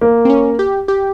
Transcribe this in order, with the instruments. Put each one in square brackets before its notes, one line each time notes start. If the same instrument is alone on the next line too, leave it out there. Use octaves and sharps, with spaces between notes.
[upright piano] A#3
[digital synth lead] C4
C#4
G4
G4